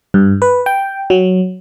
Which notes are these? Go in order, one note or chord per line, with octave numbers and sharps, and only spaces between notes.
G2
B4
G5
F#3